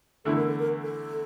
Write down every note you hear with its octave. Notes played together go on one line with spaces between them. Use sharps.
E2 D3 A3 E4 A4
A#4
A4
A#4
A4